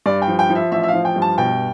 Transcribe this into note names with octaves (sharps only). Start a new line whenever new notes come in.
G2 D5
G5
F3
G5
F3
E5
A1 E5
E5
F5
F3
G5
G2
A5
B2 G5